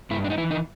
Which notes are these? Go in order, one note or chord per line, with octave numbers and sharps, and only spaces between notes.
G2 E4
D4
D#4
E3 E4
D#4